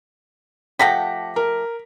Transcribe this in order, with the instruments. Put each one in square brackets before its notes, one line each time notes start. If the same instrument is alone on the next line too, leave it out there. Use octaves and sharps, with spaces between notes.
[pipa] F3 A3 G4 [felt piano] F#5 A#6 B6
[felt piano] A#4